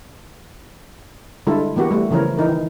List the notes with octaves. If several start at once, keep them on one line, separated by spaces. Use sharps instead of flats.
D3 G3 G#3 E4 F4 A4
E3 A#3 B3 F#4 G4
G3 A3
C#3 E3 F3 A#4 C#5
E3 D#4 A#4
D#3